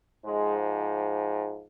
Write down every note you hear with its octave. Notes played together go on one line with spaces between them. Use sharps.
G#2 F3 G#3